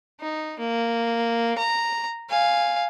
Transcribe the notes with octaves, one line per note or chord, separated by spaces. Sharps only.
D#4
A#3
A#5
F5 G#5